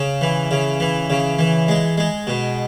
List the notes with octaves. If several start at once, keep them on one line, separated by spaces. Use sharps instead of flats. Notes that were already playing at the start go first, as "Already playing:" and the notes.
Already playing: C#3
E3
C#3
E3
C#3
E3
G#3
G#3
B2